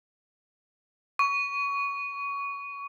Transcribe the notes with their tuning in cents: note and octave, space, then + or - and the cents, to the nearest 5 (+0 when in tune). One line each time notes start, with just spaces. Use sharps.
C#6 +20